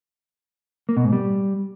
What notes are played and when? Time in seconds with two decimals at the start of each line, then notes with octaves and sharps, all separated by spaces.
0.89 A#3
0.97 B2
1.05 G#2
1.13 G3